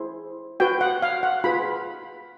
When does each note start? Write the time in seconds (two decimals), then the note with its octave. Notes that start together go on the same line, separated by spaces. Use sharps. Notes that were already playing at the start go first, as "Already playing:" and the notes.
Already playing: E4 G#4 C5
0.60 F#4 B4 G5
0.81 F#5
1.02 F5
1.23 F#5
1.44 F4 G#4 B4 B5